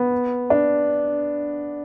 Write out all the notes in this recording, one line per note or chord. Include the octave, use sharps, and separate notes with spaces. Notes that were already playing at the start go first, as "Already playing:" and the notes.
Already playing: B3
D4